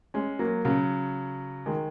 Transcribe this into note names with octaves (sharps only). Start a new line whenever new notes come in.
G#3 C#4
F#3 A#3
C#3 F#3
D#3 G#3